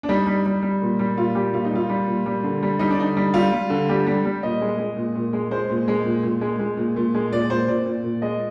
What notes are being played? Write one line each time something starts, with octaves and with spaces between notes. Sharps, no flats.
D4
G3 D#4
G3
G3
G3
A#2
G3
A#2 F4
G3 G4
A#2 F4
D#4
G3 F4
G3
A#2
G3
D3
G3
G3 D#4
D4
D3 D#4
G3
G3 F4
G3
D3
G3 G4
G3
G3
A#2 D#5
G#3
G#3
A#2
A#2
G#3
G#3 C5
A#2
G#3
A#2
A#2
G#3
G#3
A#2
A#2
G#3
A#2 D5
A#2 C5
A#2 D5
A#2
A#2
G#3 D#5